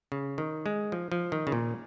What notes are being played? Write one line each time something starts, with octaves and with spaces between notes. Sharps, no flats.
C#3
D#3
G#3
F3
F3
D#3
C#3
A#2